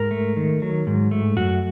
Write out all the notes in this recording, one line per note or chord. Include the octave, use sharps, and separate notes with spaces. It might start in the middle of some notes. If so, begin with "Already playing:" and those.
Already playing: G#2 A#4
A3
D#3
F#3
G#2
A3
F#2 F#4